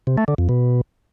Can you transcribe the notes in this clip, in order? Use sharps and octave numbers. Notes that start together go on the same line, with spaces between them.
C3
A3
D3
F2
B2